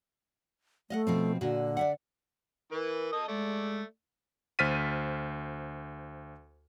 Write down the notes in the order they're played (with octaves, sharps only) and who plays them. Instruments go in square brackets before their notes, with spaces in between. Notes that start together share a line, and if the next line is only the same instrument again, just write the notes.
[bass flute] A3 [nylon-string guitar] D#5 F5 F#5
[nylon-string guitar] B2 F3 C4
[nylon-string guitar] A#2 F#4 [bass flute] D3
[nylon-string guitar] D5 E5 F#5
[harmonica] E3 B4 [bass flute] A#4
[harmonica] A4 D#5 D#6
[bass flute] G#3 [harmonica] A3 D5
[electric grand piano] D2 C5 F6 A6 B6 D#7